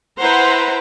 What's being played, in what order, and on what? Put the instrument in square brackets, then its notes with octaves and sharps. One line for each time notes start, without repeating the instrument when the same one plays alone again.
[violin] E4 B4 [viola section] C5 F#5 A#5